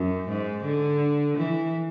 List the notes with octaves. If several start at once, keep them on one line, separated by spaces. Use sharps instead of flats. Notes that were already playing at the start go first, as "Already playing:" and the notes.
Already playing: F#2
G#2
D3
E3